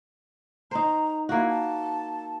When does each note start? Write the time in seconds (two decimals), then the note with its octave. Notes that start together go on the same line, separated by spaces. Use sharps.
0.71 D#4 C5 A#5
1.29 A#3 E4 F#4
1.49 A5